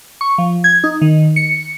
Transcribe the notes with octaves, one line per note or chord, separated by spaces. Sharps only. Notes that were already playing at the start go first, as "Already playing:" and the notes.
C#6
F3
G#6
D#4
D#3
C#7